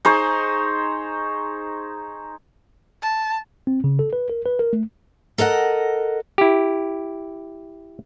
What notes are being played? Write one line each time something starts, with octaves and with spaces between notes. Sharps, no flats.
D#4 G#4 C5 C#5
A5
C4
C#3
A4
B4
A#4
B4
A#4
A3
A4 A#4 D#5 F#5
E4 G4